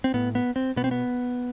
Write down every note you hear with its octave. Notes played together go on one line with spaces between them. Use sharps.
C4
A2 B3
B3
C4
B2 B3
C4
B3